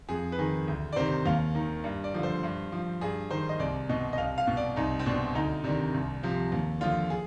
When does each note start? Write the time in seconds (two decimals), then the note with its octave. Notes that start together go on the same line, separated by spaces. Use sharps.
0.09 F2 G#4
0.32 B4
0.39 D#3 G#4
0.68 D2
0.92 D5
0.96 C3 D#3 C5
1.26 D#2 F5
1.55 D#3
1.84 G2
2.04 D5
2.14 D3 F3
2.23 C5
2.43 G2
2.72 F3
3.01 G2 G#4
3.30 D#3 C5
3.49 D#5
3.59 C2 D5
3.89 B2 D#5
4.13 D#5
4.18 C2 F5
4.38 F5
4.47 B2
4.57 D5
4.76 C2 D#4
4.99 C4
5.06 B2 D4
5.35 D2 D#4
5.64 C3 D#3 D4
5.94 C2
6.23 C3 F3
6.52 D#2
6.81 D3 F3 F4
7.10 G#4